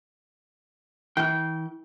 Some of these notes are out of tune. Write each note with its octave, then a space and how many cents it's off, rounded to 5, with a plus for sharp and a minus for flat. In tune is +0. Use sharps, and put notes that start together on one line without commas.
E3 -40 G5 -15